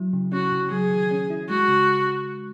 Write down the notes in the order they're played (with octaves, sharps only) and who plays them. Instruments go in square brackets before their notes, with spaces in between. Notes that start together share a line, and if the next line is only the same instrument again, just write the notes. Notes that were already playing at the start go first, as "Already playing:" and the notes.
Already playing: [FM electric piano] F#3 E4
C#3
[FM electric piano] C#4 [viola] F#4
[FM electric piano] C#3
[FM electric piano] F#3 [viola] G#4
[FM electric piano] D#3
C#4
E4
[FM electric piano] G#3 [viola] F#4
[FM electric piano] C#3